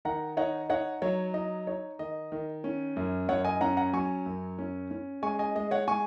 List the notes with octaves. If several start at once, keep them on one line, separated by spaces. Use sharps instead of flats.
D#3 F#5 A#5
D#4 C#5 F#5
D#4 C#5 F#5
F#3 C#5
D#4 D#5
D#4 C#5
D#3 D#5
D#3
C#4
F#2
F#2 C#5 F#5
D#5 G#5
C#4 F#5 A#5
F#5 A#5
F#3 G#5 C#6
F#2
C#4
C#4
G#3 G#5 C#6
D#5 G#5
G#3 D#5
C#5 F#5
G#3 G#5 C#6